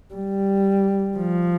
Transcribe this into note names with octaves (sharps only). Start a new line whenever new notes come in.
G3
F3